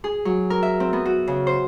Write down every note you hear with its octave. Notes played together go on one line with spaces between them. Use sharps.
G#4
F#3
A#4
E5
C4
B3
F#4
C#3
C5